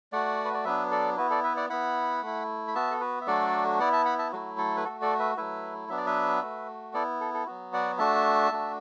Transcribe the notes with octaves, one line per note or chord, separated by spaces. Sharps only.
A3 F#4 D5 F#5
B4
D5
F#3 B3 D4 B4 E5
A4 D5
B3 E4 F#4 B4
A4 D5
B4 E5
D5 F#5
B3 E4 F#5 B5
A3 E4
B5
B3 F#4 E5 A5
A4
F#4 B4
E5
F#3 A3 D4 F#4 A4 D5
B3 E4 D5 F#5
E5 A5
F#5 B5
E5 A5
F#3 A3 E4 F#4
A4
B4
A3 F#4 A4
A4 D5
B4 E5
F#3 A3 E4 B4 E5
F#3 B3 D4 E5
D5
B4 E5
A3 F#4
B3 E4 A4 D5
A4
A4
F#3 B3 F#4
D5 F#5
A3 D4 F#4 E5 A5
A3 D4 F#4